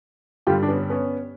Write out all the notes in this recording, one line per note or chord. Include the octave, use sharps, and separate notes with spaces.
G2 D3 G3 F4 G4
D4
B3 C#4
B3 C#4